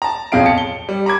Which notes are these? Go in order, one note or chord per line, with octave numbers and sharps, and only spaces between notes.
A5 A#5
B1 F2 G#4 F5 D7
A5 C#7
G7
G3
A#5 B5 D6 G#6